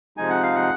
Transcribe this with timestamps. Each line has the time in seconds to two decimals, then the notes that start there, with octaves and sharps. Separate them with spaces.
0.17 C3 F3 G#3 D#4 G#5
0.30 F#5
0.43 F5
0.55 F#5